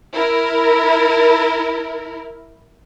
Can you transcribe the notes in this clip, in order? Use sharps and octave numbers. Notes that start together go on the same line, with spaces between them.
E4 A#4